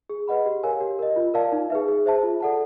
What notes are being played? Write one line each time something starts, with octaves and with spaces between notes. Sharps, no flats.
G#4
B4 D#5 F#5 B5
G4
A#4 C#5 F5 G#5
G4
A#4 D#5
F4
A#4 D5 F5 A5
D#4
G#4 B4 E5
G#4
C5 E5 A5
F4
A4 D5 F#5 A5